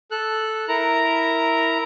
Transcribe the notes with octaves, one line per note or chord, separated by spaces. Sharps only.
A4 F#6
E4 A#4 A#5